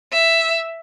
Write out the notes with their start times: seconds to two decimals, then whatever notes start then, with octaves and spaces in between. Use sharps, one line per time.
0.13 E5